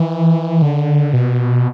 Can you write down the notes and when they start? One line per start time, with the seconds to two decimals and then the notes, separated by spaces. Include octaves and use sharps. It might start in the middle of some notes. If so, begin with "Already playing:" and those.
Already playing: E3
0.62 D3
1.13 B2